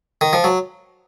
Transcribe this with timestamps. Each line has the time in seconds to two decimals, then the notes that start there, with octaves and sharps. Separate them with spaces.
0.21 D#3
0.33 F3
0.44 F#3